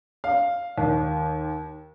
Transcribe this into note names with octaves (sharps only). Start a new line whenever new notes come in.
F5
D#2